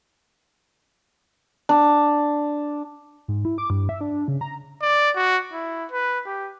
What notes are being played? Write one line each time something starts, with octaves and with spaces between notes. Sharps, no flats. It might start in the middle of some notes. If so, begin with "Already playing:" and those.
D4
G#2
E4
D6
G2
E5
D4
C#3
A#5
D5
F#4
E4
B4
G4